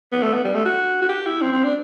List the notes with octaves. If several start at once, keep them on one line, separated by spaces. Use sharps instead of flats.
B3
A3
B3
G3
A3
F#4
F#4
G4
E4
C4
C4
D4